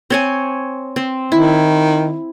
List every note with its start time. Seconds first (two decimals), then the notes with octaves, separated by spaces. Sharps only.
0.10 C4 C#5 G#5
0.96 C4
1.32 D#3 E4